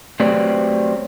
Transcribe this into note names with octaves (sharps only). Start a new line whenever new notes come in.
F#3 A3 C4 G4 B4 D5